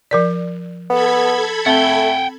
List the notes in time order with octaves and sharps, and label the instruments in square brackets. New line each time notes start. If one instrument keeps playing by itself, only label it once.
[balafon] F3 A#4 D5
[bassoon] B3 [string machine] A4 B5 G#6
[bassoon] A3 [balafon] C4 [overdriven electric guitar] F#5 G5